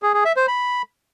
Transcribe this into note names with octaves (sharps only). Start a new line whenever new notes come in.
G#4
G#4
E5
C5
B5